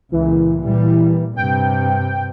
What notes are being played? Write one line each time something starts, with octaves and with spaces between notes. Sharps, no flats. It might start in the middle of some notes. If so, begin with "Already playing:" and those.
C#2 A#2 E3
A#2 G3
G2 C3 G5